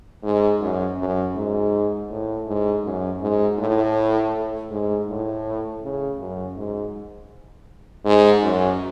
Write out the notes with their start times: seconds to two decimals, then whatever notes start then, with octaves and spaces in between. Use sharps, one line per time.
0.23 G#2
0.60 F#2
0.98 F#2
1.35 G#2
2.10 A2
2.47 G#2
2.84 F#2
3.21 G#2
3.59 A2
4.70 G#2
5.07 A2
5.82 C#3
6.19 F#2
6.56 G#2
8.05 G#2
8.43 F#2